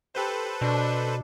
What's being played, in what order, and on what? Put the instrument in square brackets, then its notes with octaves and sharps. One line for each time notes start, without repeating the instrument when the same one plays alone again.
[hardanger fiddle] G4 [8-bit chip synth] A4 B4 C5
[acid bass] B2 [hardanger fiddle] D4